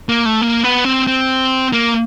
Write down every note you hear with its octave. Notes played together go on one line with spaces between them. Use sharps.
A#3
A3
A#3
B3
C4
C4
A#3